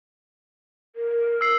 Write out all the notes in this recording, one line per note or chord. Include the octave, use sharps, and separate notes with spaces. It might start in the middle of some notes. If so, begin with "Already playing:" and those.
A#4
E6 C7